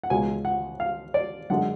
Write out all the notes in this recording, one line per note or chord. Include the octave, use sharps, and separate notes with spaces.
F#5
C#2 B2 G#3 G#5
F#5
F5
D5
F#2 D3 G#3 F#5